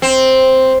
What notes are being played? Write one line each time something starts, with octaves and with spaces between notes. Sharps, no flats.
C4